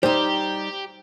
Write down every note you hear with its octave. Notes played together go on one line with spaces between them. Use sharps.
G3 D#4 G4 C5